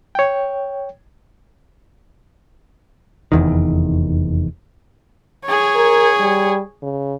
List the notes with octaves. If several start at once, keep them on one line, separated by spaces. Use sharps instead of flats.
C#5 G5
F1 E2 D#3
G#4 C#5
A#4
G3
C#3